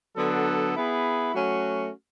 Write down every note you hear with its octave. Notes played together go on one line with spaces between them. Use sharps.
D3 F#3 B3 D4 A4
B3 E4 G#4
F#3 A3 C#4 F#4